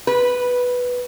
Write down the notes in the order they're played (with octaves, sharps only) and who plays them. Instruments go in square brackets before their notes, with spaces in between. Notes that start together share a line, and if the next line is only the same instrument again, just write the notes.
[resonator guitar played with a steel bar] B4